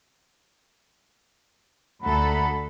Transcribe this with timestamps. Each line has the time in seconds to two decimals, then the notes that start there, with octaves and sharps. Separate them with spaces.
2.03 D2 A4 F#5 A#5 B5